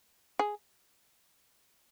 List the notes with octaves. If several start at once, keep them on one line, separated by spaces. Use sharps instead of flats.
G#4